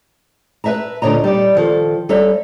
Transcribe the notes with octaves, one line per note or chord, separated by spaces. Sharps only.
B4 C5 E5 A5 A#5
D2 A#2 D3 C#5 D#5 A#5
G3 D#4 D5
D#3 F3 A4
G3 A4 C#5 E5 A#5